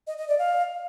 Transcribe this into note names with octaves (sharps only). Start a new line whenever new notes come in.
D#5
D#5
D5
F5